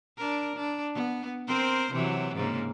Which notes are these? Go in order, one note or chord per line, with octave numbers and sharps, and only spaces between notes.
D4 A#4
D4
B3
C4 A#4 C5
C3 E3 F#3
G#2 C#3 A#3